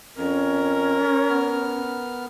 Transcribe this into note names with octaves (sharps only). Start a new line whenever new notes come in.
F2 C#4 A#4
B3 F6